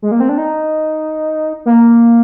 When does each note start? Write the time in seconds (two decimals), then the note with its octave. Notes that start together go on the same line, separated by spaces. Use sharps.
0.02 G#3
0.11 A#3
0.20 C4
0.29 D4
0.38 D#4
1.66 A#3